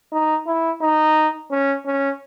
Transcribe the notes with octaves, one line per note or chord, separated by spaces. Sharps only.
D#4
E4
D#4
C#4
C#4